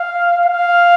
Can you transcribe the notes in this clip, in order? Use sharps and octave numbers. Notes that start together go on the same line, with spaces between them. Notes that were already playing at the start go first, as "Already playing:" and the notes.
Already playing: F5
F5